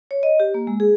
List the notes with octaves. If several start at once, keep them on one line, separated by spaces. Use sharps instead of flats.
C#5
D#5
G4
A#3
G#3
G#4